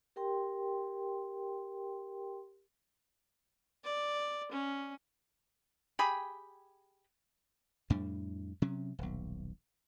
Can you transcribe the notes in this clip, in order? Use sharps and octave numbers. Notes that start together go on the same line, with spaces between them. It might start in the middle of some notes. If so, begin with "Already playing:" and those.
G4 A#4 G5 C6
D5
C#4
G4 G#4 G5 B5
F2 A2 G3 D4
C3 F#3 C#4
D#1 B1